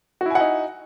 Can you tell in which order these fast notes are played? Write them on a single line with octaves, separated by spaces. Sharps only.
F#4 E4 G#5 F#5 D#4